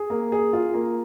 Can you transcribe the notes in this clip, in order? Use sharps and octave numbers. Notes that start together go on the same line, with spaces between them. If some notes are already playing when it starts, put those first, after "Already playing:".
Already playing: G#4
A#3
G#4
F4
A#3